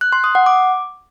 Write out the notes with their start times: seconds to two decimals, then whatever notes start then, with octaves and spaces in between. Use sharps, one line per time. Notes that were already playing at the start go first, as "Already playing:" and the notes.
0.01 F#6
0.12 C6
0.24 D#6
0.35 F#5
0.46 D6